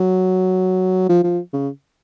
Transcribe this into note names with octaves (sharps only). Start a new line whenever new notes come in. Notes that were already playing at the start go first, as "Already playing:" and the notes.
Already playing: F#3
F3
F3
C#3